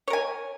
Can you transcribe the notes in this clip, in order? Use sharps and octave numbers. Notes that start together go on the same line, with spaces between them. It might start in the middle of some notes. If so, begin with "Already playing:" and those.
A#4 C#5 G#5